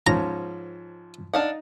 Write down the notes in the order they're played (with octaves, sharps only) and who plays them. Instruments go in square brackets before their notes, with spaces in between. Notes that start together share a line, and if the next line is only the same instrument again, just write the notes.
[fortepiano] G#2 F3 C#4 [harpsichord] A#5
[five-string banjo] D4 F5 F#5 [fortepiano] D#4